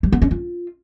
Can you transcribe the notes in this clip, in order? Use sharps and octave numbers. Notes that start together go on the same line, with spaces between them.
G3
B3
C#4
F4